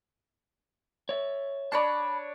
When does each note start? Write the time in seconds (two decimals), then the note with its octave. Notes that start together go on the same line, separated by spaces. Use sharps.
1.09 C#5 E5
1.72 D4 C#5 D5 A5 B5